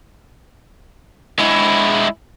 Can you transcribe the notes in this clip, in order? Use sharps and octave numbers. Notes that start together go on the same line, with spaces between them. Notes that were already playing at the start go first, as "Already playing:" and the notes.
G#3 E4